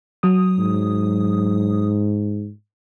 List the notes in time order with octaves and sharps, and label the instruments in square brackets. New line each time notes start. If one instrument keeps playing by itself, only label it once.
[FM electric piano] F#3 D#6
[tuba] G#2